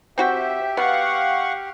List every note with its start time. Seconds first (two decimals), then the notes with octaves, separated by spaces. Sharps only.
0.18 C4 F#4 G4 E5 G5
0.77 B3 F5 F#5 C#6